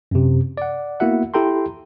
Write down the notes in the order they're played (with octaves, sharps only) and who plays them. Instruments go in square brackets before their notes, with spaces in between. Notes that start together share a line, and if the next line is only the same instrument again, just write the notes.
[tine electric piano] F#2 C3
D5 F#5
A#3 B3 E4 F#4 E5 F#5
E4 G4 A4 G5 A#5 C6